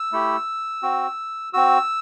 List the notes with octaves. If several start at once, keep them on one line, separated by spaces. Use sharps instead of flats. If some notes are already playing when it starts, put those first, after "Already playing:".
Already playing: E6
A3 E4 G4
C4 F#4
C4 F#4 E6